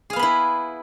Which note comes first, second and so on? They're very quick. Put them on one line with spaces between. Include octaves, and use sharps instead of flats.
G#4 F5 B3 B4 E4